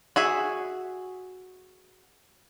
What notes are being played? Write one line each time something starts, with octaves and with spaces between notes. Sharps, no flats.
F#4 G#4 E5